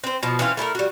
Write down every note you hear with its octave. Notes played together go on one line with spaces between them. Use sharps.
C4 C5
B2 F3
E3 C4 C#4 F4
A3 E4 G#4 A#4
G3 F#4